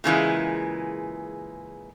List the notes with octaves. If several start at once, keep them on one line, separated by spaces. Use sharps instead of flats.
A#2 C#3 E3 G#3